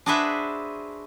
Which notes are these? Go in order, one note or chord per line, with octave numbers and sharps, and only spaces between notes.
D4 F#4 G#4 B4 C5 E5